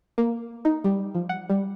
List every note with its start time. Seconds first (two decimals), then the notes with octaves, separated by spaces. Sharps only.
0.18 A#3
0.65 D#4
0.84 G3
1.15 F3
1.29 F#5
1.49 G3